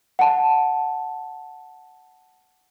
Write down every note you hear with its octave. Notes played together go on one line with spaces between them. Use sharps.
F#5 A5